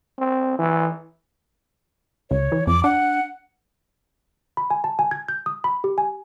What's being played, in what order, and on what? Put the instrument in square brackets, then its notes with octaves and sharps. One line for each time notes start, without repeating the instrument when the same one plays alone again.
[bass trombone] C4
E3
[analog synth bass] C#2 [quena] C#5
[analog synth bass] E3
[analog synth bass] F2 [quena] D6
[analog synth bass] D4 [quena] F#5
[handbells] B5
G#5
A5
G#5
G#6
G6
D#6
B5
G4
G#5